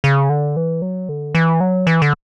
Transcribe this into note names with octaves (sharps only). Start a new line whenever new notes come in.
C#3
D3
E3
F#3
D3
E3
F#3
E3
D3